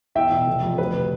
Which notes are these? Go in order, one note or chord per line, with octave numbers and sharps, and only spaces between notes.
E2 E5 G5
B2
F1
F2
D2 B4
C3